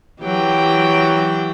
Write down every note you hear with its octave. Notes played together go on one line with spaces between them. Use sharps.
E3 F#3 G4 G5